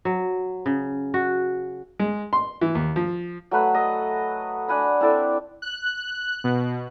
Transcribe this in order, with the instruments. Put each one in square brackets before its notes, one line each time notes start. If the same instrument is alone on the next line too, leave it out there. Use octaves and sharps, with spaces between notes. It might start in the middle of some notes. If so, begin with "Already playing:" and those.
[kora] F#3
C#3
F#4
[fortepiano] G#3
C6
E3
D#2
F3
[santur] F#3 A3 B4 F#5
A4 D#5
D4 F#5 G#5 B5
C4 E4 A4 D5
[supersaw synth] F#6
B2